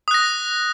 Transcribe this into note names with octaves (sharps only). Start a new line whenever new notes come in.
D#6 F#6 A#6